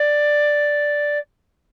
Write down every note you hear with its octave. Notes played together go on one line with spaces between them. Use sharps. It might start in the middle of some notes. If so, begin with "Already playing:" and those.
Already playing: D5